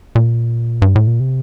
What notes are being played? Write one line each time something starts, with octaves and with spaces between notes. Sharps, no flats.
A#2
G2
A2
A#2
C3